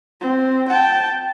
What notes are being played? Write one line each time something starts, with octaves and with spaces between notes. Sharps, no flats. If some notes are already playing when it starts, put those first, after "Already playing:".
C4
G5 A5